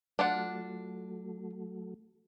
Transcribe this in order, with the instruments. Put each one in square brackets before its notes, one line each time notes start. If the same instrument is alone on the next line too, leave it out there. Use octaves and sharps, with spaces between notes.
[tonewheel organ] F#3 A3 [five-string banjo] D4 F4 F#5